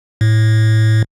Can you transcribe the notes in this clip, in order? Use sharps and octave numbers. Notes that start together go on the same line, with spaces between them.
A2